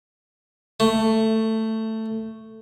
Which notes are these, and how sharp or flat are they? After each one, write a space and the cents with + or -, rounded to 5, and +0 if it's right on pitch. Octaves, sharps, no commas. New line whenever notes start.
A3 +10